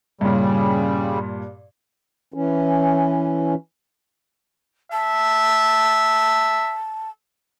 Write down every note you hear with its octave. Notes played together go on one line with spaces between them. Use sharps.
G2 A#2 C#3 G3
E3 C#4
E5 A5